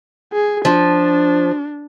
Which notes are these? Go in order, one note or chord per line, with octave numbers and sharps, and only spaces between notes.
G#4
F3 D4